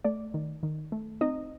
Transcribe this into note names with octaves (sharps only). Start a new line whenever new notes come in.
A3 D5
D#3
D#3
A3
C4 D#4 D#5